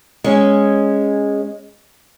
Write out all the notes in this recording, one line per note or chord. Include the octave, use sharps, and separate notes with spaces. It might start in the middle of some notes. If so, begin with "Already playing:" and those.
G#3 C#4